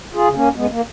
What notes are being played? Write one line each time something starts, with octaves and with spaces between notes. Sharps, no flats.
F4 G#4
C#3
A#3 C#4
F#2 G#3 B3
A#3